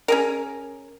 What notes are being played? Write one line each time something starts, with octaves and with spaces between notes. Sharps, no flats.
C#4 G#4 A#4